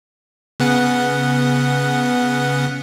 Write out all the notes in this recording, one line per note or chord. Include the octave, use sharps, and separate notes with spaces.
C#3 B3 F#5